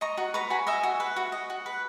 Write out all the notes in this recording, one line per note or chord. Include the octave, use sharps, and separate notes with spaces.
D#5 A#5 C#6
F#4
B4 A#5 C#6
F#4 G#5 B5
D#5 E5 G#5
F#4
B4
F#4
D#5
F#4
B4